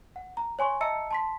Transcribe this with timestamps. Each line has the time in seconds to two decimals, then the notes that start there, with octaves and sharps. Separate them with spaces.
0.16 F#5
0.37 A#5
0.59 C#5 G#5 C6 C#6
0.81 D#5 E5 A5 A#5 E6 C#7
1.11 A5 C6 B6